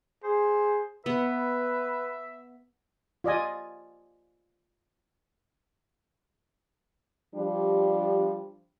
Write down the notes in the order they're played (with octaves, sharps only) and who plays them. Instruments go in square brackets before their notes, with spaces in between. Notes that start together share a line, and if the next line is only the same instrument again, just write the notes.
[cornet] G#4 [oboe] C5
[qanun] B3 [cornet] B4 [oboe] E5
[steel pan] F4 D5 D#5 G#5
[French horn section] F3 G3 D4 G4